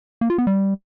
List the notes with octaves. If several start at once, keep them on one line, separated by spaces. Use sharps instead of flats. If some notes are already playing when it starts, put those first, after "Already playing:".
A#3
F4
B3
G3